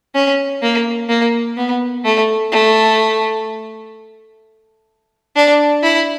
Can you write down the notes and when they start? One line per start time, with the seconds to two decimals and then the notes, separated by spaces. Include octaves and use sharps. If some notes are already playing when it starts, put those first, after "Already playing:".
0.15 C#4
0.62 A#3
1.09 A#3
1.57 B3
2.04 A3
2.52 A3
5.36 D4
5.82 E4